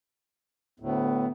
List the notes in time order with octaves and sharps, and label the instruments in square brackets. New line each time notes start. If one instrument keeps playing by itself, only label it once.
[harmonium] D2 A2 [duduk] B3